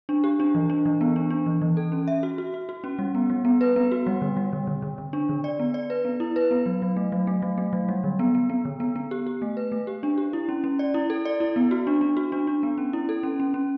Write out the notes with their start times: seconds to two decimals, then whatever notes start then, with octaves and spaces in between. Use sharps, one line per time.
0.09 D4
0.24 G4
0.40 D4
0.55 E3
0.70 D4
0.86 E3
1.01 B3
1.16 D4
1.30 D4
1.46 E3
1.62 E3
1.77 A4
1.92 C#4
2.08 E5
2.23 F#4
2.38 F#4
2.54 F#4
2.69 F#4
2.84 C#4
2.99 G3
3.15 B3
3.30 G3
3.45 B3
3.61 B4
3.76 B3
3.91 F#4
4.07 G3
4.22 D3
4.37 G3
4.53 D3
4.67 D3
4.82 D3
4.98 D3
5.13 D4
5.29 D3
5.44 D5
5.59 B3
5.74 D5
5.90 B4
6.05 B3
6.20 E4
6.36 B4
6.51 B3
6.66 F#3
6.82 F#3
6.96 A3
7.12 F#3
7.27 A3
7.42 F#3
7.58 A3
7.73 F#3
7.89 G3
8.04 D3
8.19 B3
8.35 B3
8.50 B3
8.65 D3
8.80 B3
8.96 B3
9.11 G4
9.27 G4
9.42 A3
9.57 B4
9.72 A3
9.87 G4
10.03 D4
10.18 G4
10.33 E4
10.49 C#4
10.64 C#4
10.79 D5
10.94 E4
11.10 A4
11.25 D5
11.40 E4
11.56 B3
11.71 F#4
11.87 D4
12.01 D4
12.17 F#4
12.32 D4
12.47 D4
12.63 B3
12.78 C#4
12.93 E4
13.09 A4
13.23 C#4
13.40 C#4
13.54 C#4